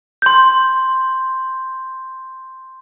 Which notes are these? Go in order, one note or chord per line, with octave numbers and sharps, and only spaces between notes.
C6 G6